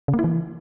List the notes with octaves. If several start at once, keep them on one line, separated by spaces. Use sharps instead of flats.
C#3
A#3
E4
E3